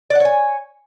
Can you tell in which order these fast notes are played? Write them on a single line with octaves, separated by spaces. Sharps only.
D5 F#5 C#5 G#5